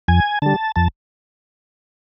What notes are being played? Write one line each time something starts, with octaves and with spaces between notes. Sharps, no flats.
F2 G#5
D3 G3 A5
F2 A5